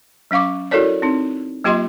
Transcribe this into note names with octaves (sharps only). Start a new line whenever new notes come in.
F#3 C#4 F5 C#6 D6
E4 F#4 A4 A#4 C#5 D5
C4 D#4
F#3 A#3 F4 G4 D#5 C6